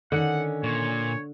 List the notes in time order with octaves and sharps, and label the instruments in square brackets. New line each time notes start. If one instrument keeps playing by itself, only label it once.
[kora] D3 [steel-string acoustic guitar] D#3 C#4 [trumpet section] F#5
[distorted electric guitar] A#2 [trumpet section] C#5